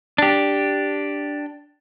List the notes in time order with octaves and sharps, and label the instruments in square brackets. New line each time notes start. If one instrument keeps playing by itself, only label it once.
[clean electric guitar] D4 G4